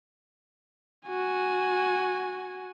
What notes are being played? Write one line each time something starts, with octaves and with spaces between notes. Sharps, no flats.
F#4 G#5